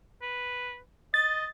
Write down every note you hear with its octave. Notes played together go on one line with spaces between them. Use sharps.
B4
D#5 A6